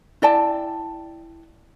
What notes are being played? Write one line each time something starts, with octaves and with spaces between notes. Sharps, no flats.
E4 D5 G5 A5